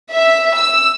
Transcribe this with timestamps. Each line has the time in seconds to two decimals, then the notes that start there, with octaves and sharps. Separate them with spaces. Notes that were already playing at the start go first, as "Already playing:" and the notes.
0.11 E5
0.56 E6